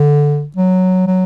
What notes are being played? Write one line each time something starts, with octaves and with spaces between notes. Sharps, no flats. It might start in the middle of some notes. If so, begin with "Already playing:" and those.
Already playing: D3
F#3
F#3